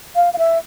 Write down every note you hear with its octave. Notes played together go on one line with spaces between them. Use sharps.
F5
F5
E5